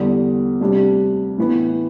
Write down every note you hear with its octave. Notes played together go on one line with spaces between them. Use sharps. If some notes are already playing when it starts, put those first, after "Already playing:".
Already playing: E2 D3 G3
D2 C3 G3 D4
A2 E3 B3